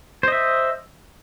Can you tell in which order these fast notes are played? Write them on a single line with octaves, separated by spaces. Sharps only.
C5 D#5 E5